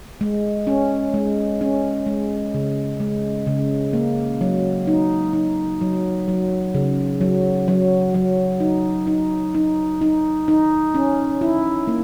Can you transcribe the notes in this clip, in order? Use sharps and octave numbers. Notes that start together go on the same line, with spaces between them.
G#3
C#4
G#3
C#4
G#3
C#3
G#3
C#3
A#3
F#3
D#4
D#4
F#3
F#3
C#3
F#3
F#3
F#3
D#4
D#4
D#4
D#4
D#4
C#4
E4
A#3